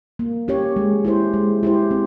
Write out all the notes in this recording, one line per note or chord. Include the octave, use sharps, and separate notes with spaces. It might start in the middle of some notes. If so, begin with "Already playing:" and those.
A#3
C#4 G4 C#5
G#3
E4 G4 C5
G#3
E4 G4 C5
C4